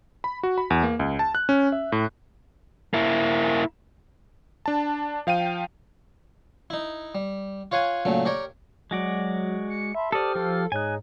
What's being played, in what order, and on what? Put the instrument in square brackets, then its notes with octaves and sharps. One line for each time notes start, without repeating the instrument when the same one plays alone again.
[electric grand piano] B5
F#4
B5
E2
A#3
C#2
A5
F#6
C#4
E5
A2
[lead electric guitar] A#3 E4
[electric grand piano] D4 A5
F3 F5 G5 D#7
[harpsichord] D#4 E4
G3
F4 C#5 F5 F#5 G#5
A#2 C#3 F#3 A3
G4 A#4 C#5 D5
[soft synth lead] F#3 [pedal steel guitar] G#3 F#4 D5
[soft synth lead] C#7
[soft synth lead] E5 [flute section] A5 B5 C6
[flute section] G4 C5 F6 [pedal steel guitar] A4 D5 [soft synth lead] D#6
[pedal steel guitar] F3 F4 [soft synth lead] A4
[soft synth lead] G#2 [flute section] D#4 G#4 C#5 [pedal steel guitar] G#5 F#6